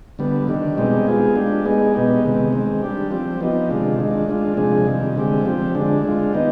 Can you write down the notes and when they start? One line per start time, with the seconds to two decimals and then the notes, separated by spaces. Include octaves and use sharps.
0.19 D3 G3 B3
0.48 D#3 G3 D4
0.77 B2 G#3 C4 D#4 G4
1.07 G#3 B3 F4 G#4
1.36 G#3 D4 G4
1.65 G#3 B3 D#4 G#4
1.94 B2 G#3 B3 D#4 G4
2.23 C3 D#3 G#3 B3
2.53 D#3 G#3 C4
2.82 G3 D4 G4
3.11 F3 C4 G4
3.41 F3 B3 D#4 G4
3.70 C3 D#3 G#3 D4 F4
3.99 D#3 G#3 D4
4.29 G#3 D4 F4
4.57 C3 F3 G#3 D4 G#4
4.87 C3 D#3 G3
5.16 D3 G#3 C4 G4
5.45 F3 C4 G4
5.75 D3 G#3 D4
6.03 G#3 D4 F4
6.33 D#3 B3 D#4 G4